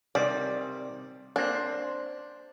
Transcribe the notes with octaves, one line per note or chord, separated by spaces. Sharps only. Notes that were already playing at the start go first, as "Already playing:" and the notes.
C3 D#3 G3 D5
A#3 C4 D4
C5